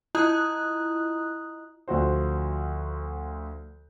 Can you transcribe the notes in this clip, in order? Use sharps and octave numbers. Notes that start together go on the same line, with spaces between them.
E4 F4 D#5 A#5 D#6 F#6
D2 F3 F#4 C5